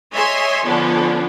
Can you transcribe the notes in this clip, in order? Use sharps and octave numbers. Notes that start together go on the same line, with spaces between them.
C#5 D#5 E5 G#5 C6
D3 F3 B3 C#4 D4